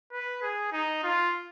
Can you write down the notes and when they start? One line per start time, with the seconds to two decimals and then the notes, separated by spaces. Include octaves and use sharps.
0.12 B4
0.42 G#4
0.72 D#4
1.03 F4